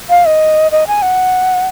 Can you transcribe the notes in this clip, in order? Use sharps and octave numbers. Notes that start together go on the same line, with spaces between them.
F5
D#5
D#5
G#5
F#5